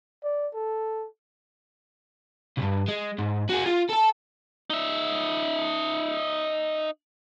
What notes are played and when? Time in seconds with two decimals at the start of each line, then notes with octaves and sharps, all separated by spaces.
0.24 D5
0.54 A4
2.58 C2 G2
2.89 G#3
3.19 G#2
3.49 F#4 G#4
3.65 F4
3.89 A4 A5
4.70 D#4 E5